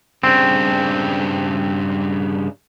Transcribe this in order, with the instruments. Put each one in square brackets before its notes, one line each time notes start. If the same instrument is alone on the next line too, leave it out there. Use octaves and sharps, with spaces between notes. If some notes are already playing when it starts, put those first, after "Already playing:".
[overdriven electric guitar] G2 C#3 [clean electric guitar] C4